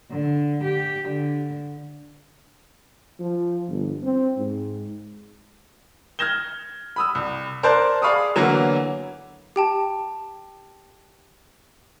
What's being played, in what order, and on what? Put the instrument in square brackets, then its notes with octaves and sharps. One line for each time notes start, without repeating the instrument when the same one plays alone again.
[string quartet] D3
G4
D3
[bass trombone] F3
G1
C4
G#2
[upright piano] F6 G6 G#6 A#6 E7 G7
B5 D#6 E6
C2
A#4 C5 D5 A5 F#6
G#4 D5 F5 B5 C#6 D#6
D3 E3 F#3 A#3 B3
[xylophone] G4 G5 A5